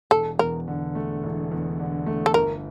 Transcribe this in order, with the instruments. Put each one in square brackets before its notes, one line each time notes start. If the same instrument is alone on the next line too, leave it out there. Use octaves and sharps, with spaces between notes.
[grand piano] E1 [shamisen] A4
[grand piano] E2 [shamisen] A#4
[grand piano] D3
A3
E1
E2
D3
A3
[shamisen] A4
[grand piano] G1 [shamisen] A#4